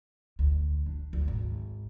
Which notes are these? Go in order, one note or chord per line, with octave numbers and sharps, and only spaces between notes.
D2
D4
D2
G#1